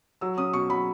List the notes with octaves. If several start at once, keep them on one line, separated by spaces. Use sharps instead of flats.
F#3 E6
C#4 D#6
B2 C#6
F#3 B5